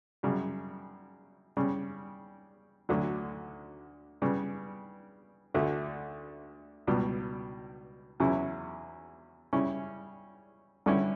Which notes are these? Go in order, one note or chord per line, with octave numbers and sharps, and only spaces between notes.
F#2 C#3 G3
C#3 G3 C#4
D2 D3 F#3
C#3 G3 B3
D2 D3 A3
C#2 B2 G3
E2 C#3 F#3 C#4 E4
C#3 G3 C#4 E4
G2 D3 G3 C#4 E4